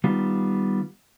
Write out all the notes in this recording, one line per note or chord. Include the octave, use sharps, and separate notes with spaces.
D#3 G3 B3 F4